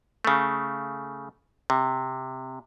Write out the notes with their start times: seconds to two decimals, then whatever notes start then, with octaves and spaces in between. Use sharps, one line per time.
0.25 C#3 A3
1.70 C3